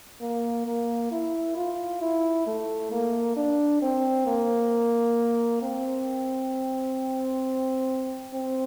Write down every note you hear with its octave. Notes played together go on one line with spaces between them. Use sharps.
A#3
A#3
E4
F4
E4
A3
A#3
D4
C4
A#3
C4
C4